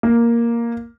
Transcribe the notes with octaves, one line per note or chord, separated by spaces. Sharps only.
A#3